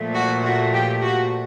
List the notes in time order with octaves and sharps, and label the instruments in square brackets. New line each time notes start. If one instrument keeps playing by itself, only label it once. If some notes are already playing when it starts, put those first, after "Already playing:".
Already playing: [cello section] A#2 F3 A3
F#4
F#4
G4
F#4